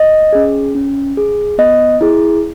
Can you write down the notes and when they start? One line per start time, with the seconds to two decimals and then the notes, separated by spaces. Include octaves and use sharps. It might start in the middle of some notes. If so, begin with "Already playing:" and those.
Already playing: D#5
0.33 C#4 G#4
0.75 C#4
1.17 G#4
1.58 B3 D#5
2.01 E4 G#4